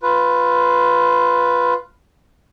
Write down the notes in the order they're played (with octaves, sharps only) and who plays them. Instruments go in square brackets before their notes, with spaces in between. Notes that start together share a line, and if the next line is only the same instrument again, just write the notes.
[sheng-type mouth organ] F4 B4